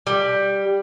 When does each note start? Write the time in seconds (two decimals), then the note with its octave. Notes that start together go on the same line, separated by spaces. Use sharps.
0.07 G3